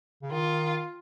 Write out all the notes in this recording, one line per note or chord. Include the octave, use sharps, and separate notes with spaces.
C#3
D#3 F4